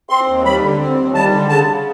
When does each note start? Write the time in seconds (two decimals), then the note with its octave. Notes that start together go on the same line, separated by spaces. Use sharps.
0.09 C4 C6
0.27 D#2
0.45 G3 B5
0.62 D3
0.79 C4
0.96 D#2
1.14 G3 A5
1.31 D3
1.49 C#3 A5
1.66 C#3